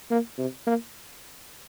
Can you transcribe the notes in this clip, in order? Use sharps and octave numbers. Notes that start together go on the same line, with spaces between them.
A#3
C3
A#3